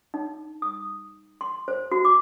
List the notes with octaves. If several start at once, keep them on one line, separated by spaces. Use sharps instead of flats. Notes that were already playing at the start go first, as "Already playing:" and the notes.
D#4
D#6
C6
C5
F#4
D6